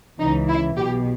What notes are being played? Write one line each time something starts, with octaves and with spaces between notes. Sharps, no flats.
C#2 C#3 E3 D#4
E4
B1 B2 G4